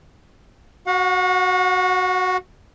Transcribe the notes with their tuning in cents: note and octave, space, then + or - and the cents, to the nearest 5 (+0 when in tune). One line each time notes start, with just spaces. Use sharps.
F#4 +0 F#5 -40